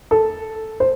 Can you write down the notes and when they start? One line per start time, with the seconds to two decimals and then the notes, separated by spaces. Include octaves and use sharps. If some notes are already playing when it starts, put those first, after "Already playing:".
0.11 A4
0.80 C5